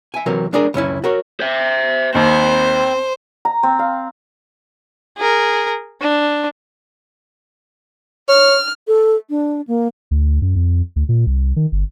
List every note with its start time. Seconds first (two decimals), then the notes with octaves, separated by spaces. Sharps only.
0.14 E5 G#5
0.26 C3 E3 F#3 C4 A#4
0.53 G#3 D4 G#4 A#4
0.74 C#2 F#2 C#4 E4
1.04 F#4 A#4 C#5
1.40 C5 E5
2.15 D#2 C4 C5 B5
3.45 A#5
3.63 C4
3.79 F5
5.17 G#4 A#4
6.01 D4
8.29 C#5 F6
8.88 A4
9.30 D4
9.67 A#3
10.11 D2
10.42 F#2
10.56 F2
10.96 D2
11.09 A#2
11.26 C2
11.56 D#3
11.72 G1